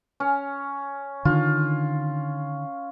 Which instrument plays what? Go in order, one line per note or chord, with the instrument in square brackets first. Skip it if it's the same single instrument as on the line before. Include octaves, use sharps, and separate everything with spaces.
[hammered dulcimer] C#4
[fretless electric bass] D3 D#3 [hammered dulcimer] F4